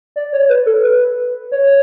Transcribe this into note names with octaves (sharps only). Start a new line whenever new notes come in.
D5
C#5
B4
A4
B4
C#5